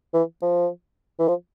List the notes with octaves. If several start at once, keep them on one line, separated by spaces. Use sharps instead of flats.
E3
F3
E3
F3